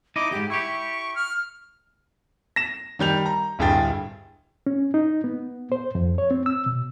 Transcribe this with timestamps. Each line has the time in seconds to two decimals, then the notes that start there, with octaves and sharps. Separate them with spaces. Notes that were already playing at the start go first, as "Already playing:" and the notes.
0.16 D#4 E4 D#5 D6
0.31 F2 G#2 G4
0.50 E4 G4 C#6
1.16 F6
2.56 A#6 E7
2.99 D#3 G3 G6 F7
3.26 A#5
3.59 D1 G2 G#4 G5 A6
4.67 C#4
4.94 D#4
5.24 B3
5.72 C5
5.95 F2
6.18 C#5
6.31 C4
6.46 E6
6.66 B2